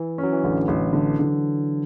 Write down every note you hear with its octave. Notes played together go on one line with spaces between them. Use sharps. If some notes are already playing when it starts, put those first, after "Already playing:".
Already playing: E3
F#3 C#4
E3
A1 D3
A1
D3
D3